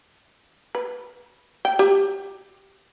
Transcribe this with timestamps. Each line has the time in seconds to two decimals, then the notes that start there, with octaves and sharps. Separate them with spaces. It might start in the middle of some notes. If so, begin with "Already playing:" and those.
0.75 B4
1.65 G5
1.79 G4